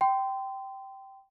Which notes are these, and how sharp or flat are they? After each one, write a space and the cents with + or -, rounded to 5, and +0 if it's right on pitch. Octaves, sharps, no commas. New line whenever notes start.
G5 -15 C6 -25